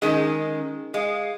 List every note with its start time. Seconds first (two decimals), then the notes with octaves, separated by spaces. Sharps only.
0.02 D#3 G#3 C#4
0.94 G#3 F5